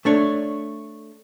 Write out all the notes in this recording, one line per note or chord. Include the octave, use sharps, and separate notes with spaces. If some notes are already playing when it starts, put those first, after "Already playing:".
A3 D4 C#5